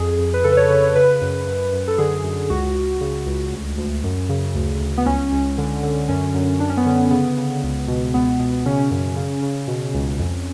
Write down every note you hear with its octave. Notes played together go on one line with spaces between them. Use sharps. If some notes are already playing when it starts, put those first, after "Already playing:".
Already playing: F2 G#4
F2
B4
C#3 A4
B4
C#5
C#3 B4
C#5
C#3 B4
F#2
F#2
F#2
A4
D3 G#4
F#2
C#2 F#4
C#2
C#3
C#2
D2
D2
F#2
C#3
D2
D2
B3
C#2 C#4
C#2
D3
D3
F#2 C#4
F#2
F#2 D4
C#4
B3
D3 C#4
C#3 B3
C#3
C#2
B2
C#2 B3
B2
C#3 C#4
F#2
C#3
C#3
B2
C#2
F2